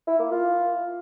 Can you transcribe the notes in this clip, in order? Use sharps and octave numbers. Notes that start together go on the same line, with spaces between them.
E4
A#3
F4